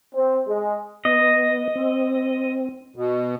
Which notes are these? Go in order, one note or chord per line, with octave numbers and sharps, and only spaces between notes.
C4
G#3
B3 D#5
C4
B2